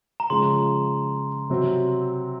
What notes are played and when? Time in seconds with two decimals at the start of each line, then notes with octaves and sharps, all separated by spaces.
0.20 A#5
0.30 C#3 F3 G#3 C6
1.50 C3 F#3 C4